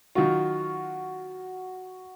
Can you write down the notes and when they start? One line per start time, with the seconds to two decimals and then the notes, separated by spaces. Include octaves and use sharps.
0.15 D#3 F#3 F4 F#4